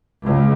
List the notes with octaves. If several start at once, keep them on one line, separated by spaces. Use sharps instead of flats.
C#2